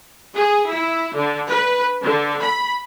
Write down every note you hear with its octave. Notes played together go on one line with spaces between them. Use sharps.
G#4
E4
D3
B4
D3
B5